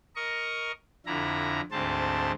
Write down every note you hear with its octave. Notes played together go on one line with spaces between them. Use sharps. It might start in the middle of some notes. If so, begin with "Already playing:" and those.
A#4 D#5 C#6
F2 D3 E4 A#5
D2 G#2 C4 C5 A5